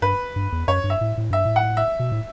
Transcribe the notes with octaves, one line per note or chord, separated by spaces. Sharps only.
G2 B4
G2
E2
F#2 C#5
G2
E5
A2
A2
G2 E5
A2
F#5
E5
B2
A2